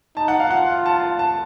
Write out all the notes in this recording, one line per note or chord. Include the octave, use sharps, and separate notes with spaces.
D#4 A5
F#5
F5
F4 F#5
A5
A5